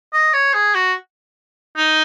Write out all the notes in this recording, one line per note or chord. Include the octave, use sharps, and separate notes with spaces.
D#5
C#5
G#4
F#4
D#4